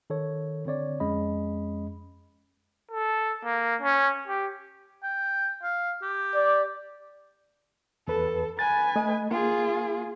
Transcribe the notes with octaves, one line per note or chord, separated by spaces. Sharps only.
D#3 A4 C#5
D3 C4 C#5 D5
F2 G#3 C#4 D#5 B5
A4
A#3
C#4
G4
G5
F5
G4
D5
E2 A4 B4
B4 G#5 A6
A3 D#5
A#3 F4 G#4